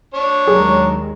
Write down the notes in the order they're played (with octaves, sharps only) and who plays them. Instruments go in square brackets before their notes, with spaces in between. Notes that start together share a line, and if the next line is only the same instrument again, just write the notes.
[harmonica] D4 C#5
[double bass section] D#2 G#3 [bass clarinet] F#3 [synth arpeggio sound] G#4